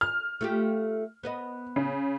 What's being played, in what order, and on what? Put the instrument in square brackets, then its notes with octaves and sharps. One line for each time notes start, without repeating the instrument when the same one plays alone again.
[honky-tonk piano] F6
[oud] A3 F4 G4
B3 B4 D#5
[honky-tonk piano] C#3